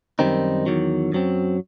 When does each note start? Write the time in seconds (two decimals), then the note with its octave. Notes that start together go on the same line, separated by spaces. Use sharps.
0.19 F#2 D#3 G3 C4 D#4
0.66 E2 D#3 F#3
1.12 F#2 F#3 C4